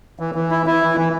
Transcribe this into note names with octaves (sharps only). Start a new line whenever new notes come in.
E3
E3
E4
E4
E3
E3